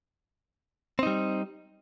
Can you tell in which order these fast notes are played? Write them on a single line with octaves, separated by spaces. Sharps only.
C4 D#4 G3